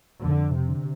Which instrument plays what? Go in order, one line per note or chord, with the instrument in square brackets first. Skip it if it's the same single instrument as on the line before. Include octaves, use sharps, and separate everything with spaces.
[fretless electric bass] F2 [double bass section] D3
[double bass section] C3
[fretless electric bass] D3